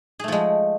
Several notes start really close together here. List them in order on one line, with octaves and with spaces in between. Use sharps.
G#4 A3 F3 G#3